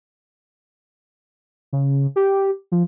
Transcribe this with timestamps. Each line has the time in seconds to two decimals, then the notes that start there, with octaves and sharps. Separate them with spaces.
1.73 C#3
2.16 G4
2.72 F3